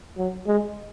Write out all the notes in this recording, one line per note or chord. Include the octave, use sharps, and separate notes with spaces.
F#3
G#3